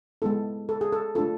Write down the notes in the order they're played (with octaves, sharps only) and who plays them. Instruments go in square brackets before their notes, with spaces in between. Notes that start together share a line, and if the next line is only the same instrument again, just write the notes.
[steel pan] G#3 B3 E4 A4
A4
G#4
A4
A3 D4 F4 A4